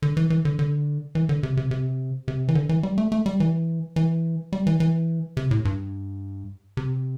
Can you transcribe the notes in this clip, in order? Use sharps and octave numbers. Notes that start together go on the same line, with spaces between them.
D3
E3
E3
D3
D3
E3
D3
C3
C3
C3
C3
E3
D3
E3
G3
A3
A3
G3
E3
E3
G3
E3
E3
C3
A2
G2
C3